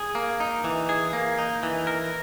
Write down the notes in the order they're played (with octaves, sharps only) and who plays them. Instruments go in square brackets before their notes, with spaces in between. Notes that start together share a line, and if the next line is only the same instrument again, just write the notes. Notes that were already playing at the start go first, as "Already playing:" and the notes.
Already playing: [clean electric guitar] G#4
A#3
D#4
E3
G#4
A#3
D#4
E3
A#4